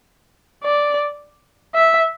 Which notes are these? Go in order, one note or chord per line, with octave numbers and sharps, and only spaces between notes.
D5
E5